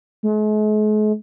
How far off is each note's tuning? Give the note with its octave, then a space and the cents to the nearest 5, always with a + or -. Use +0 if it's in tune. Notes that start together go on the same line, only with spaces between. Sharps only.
G#3 +45